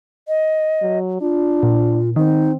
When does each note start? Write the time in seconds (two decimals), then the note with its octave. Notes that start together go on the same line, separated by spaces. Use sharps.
0.28 D#5
0.82 F#3
1.21 D4 F4
1.63 A#2
2.16 D#3 C4 D#4